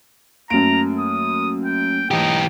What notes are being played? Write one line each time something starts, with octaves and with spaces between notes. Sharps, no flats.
F#2 A3 A#3 A#5 D7
D#6
G5
E3 D#4 G4